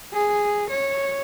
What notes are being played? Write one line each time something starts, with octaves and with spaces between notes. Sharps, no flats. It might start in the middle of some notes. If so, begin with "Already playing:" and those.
G#4
C#5